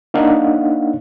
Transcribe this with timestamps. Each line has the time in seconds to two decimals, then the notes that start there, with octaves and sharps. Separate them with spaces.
0.14 A#3 D4 D#4 C#5 F5 F#5